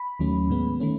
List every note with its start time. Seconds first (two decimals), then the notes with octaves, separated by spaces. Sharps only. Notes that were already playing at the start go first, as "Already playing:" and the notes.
Already playing: B5
0.19 D#2 D#3 F#3 A3 C#4
0.50 A2 G#3 B3
0.80 D#3 A3 C#4